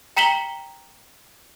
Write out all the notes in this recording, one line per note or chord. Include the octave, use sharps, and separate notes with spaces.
G5 A#5 B6 E7 F#7 G7